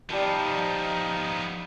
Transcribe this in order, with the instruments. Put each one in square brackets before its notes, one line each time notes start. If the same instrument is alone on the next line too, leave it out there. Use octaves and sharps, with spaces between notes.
[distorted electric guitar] F3 B3 [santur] G3 A5 [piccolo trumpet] D#4